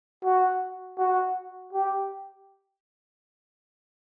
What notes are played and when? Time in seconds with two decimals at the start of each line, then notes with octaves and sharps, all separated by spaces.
0.24 F#4
0.98 F#4
1.73 G4